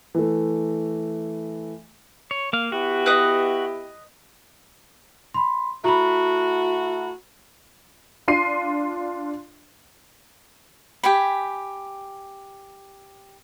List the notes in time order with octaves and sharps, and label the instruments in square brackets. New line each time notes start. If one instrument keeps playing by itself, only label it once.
[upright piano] E3 A3
[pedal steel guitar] C#5
A#3 F5
[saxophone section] B3 E4 G4 [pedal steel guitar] F#4
[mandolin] B4 D#5
[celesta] B5 C6
[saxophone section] A3 E4 F#4 [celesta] A#5 B5
[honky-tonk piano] D4 F4 C6 C7 D#7
[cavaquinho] G4 G5 G#5 B5